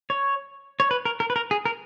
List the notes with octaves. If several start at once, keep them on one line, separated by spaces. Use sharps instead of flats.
C#5
C#5
B4
A#4
A#4
B4
A#4
G#4
A#4